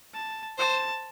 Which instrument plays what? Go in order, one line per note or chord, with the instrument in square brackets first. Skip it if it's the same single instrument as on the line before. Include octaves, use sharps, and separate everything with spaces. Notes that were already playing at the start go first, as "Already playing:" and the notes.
[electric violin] A5
[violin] C5 [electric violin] A5